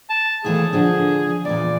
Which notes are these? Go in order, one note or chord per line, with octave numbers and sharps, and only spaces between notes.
A5
D#2 E3 A3 G#4
D3 F3 D4 G#4
E2 A#2 D5